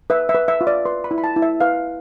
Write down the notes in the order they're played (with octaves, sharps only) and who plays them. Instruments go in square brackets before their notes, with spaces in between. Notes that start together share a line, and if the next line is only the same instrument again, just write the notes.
[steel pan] B4 E5
E5
B4
E5
F4
D5
B4 C6
B5
E4
B5
A5
E4
E5
B4 F5